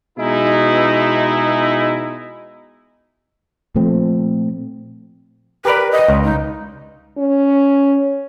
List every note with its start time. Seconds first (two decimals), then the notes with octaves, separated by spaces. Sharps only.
0.18 B2 G#3 D#4 E4
3.75 A#2 F3 A3 C4
5.65 G4 A#4 B4 D5
5.92 D#5
6.08 C#2
6.24 D#4
7.18 C#4